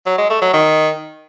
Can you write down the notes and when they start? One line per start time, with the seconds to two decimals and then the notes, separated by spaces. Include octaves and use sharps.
0.06 F#3
0.18 G#3
0.30 A3
0.42 F#3
0.53 D#3